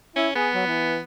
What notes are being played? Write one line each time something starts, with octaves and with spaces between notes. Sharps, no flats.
C#4 E4
B3 G#4
F#3
E3